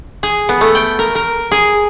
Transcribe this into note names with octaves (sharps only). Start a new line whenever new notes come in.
G#4
B3
A3
G5
A#4
A#4
G#4